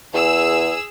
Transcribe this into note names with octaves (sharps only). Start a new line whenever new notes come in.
E2 G#4 E6